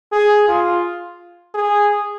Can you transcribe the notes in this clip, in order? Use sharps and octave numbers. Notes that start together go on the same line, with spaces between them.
G#4
F4
G#4